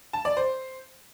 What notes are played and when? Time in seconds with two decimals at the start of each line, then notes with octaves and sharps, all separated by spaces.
0.13 A5
0.25 D5
0.37 C5